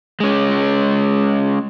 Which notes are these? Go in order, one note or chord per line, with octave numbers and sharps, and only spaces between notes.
G#3 C#4